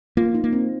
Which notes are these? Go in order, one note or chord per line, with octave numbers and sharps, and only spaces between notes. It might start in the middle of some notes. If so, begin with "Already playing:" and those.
A#3 F4
D#4
A#3
C4